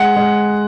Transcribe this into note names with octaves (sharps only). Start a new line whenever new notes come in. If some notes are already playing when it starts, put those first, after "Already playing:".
Already playing: G#3 F#5
G#3